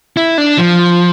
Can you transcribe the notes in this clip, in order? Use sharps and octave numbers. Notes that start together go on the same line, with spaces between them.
E4
D4
F3